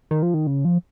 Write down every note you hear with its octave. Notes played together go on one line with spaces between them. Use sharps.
D#3
F3
D#3
C#3
F3